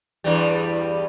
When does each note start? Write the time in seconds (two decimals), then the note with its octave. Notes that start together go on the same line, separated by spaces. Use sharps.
0.24 E2 G2 G3